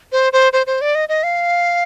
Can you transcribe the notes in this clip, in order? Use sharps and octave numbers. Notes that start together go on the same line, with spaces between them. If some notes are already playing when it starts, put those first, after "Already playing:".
C5
C5
C5
C5
D5
D#5
D#5
F5